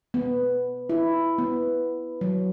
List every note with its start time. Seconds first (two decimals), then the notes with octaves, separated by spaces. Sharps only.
0.14 B3
0.89 E4
1.38 B3
2.21 F#3